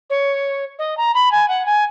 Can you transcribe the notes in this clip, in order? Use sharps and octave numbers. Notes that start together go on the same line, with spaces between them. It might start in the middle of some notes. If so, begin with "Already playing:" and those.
C#5
D#5
A#5
B5
G#5
F#5
G#5